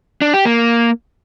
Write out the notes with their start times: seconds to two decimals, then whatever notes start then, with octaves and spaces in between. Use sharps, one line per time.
0.22 D4
0.33 G4
0.45 A#3